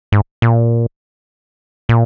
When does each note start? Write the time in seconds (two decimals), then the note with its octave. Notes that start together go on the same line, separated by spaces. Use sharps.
0.12 G#2
0.42 A#2
1.89 A#2